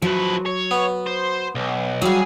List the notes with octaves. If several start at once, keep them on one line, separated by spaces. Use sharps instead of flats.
F3 F#3 B4
C#5
B3
C5
B1
F#3 G3 F#4 G#4 F5